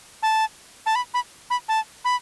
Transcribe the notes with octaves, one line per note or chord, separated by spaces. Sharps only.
A5
A5
B5
B5
B5
A5
B5